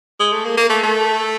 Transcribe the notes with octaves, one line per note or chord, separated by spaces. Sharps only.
G#3
A3
A#3
A#3
A3
A3